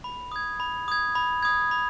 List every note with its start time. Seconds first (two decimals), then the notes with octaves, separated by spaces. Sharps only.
0.04 B5
0.32 D#6 G#6
0.60 B5
0.88 D#6 G#6
1.15 B5
1.43 D#6 G#6
1.71 B5